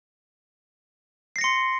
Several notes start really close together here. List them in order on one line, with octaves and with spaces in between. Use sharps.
C7 A#6 C#7 C6